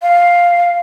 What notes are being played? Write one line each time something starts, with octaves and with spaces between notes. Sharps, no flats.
F5